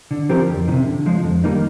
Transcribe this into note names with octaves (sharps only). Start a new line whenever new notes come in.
D3
F3 C4 G4 A#4
F2
D#3
C3
D3
F3 G#3
F2
D#3 G3 A#3 D#4